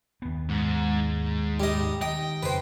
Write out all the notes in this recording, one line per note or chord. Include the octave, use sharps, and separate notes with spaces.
D#2 B3
G#2
G3 D#5
D#3 D#5 G5
F2 C#3 B4 C5